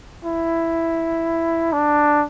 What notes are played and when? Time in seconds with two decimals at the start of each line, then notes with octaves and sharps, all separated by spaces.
0.25 E4
1.73 D4